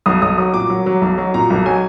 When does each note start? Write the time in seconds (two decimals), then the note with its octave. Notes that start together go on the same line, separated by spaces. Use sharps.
0.06 B1 D#6
0.22 B1 D#6
0.38 F#3 D#6
0.54 A#2 D6
0.70 F#3
0.86 F#3
1.01 B1
1.18 F#3
1.34 A#2 A#5
1.50 B1
1.66 F#3 G#5